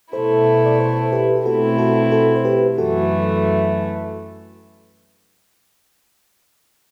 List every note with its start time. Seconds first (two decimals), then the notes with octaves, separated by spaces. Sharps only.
0.13 B2 A3 E4 A4 C5
0.66 D5
0.80 A4 C5
1.12 G4 B4
1.36 G4
1.45 B2 A3 C4 E4 F#4 A4
1.78 F#4 A4
2.12 F#4 A4
2.35 C5
2.45 G4 B4
2.78 F#2 E3 A3 F#4 A4